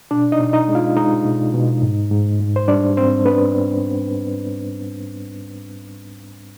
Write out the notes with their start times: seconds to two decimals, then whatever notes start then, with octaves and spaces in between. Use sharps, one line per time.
0.11 B2 D4 D5
0.32 D#4 D#5
0.39 B2
0.53 D#4 D#5
0.68 G#3
0.75 F4 F5
0.97 G#3 D#4 D#5
1.25 B2
1.54 B2
1.82 G#2
2.11 G#2
2.40 G#2
2.56 C5
2.68 G3 D4 D5
2.97 G#2 C4 C5
3.25 B3 D4 B4